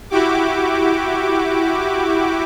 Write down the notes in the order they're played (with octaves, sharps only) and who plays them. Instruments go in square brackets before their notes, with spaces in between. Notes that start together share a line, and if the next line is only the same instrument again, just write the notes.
[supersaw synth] E4 F#4 G4 D6